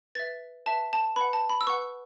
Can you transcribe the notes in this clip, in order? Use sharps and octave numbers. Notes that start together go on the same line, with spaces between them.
B4 E5 A6
B4 E5 A5
A5
B4 F#5 B5
A5
B5
E6
B4 F#5 C#6